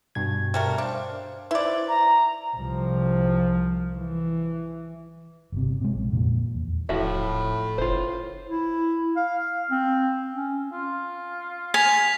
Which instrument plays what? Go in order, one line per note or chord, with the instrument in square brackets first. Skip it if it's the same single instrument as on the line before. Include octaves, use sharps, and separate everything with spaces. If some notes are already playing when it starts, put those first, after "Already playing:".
[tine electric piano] G2 B2 G#6
[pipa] G3 A3 A#4
[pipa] D4 [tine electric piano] C5 F5
[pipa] E4 D5 [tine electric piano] B4 C5
[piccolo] A#5
[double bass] C2 F3
E3
[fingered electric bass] G1 C3
C3 G#3
A#1
F2 A#2 D3 F3
E2
[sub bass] D1 [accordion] A2 [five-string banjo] F3 F#4 E5
[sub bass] F#1 [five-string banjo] F4 C5
[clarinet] E4
F5
C4
C#4
[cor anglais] F4
[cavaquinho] G#5 [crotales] B6 F7